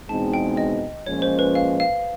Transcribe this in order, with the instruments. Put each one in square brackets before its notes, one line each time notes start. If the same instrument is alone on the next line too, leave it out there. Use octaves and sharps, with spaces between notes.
[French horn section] E2 B2 G#3 C4 D#4 [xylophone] A5
[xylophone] G5
D#5
[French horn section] A#2 F3 G#3 C#4 [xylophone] C#5
[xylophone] C5
B4
F5
F5